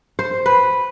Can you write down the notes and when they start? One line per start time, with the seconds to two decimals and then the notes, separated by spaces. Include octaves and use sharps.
0.19 C5
0.46 B4